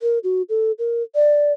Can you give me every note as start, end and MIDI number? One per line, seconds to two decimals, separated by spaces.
0.02 0.19 70
0.24 0.42 66
0.49 0.72 69
0.79 1.03 70
1.15 1.53 74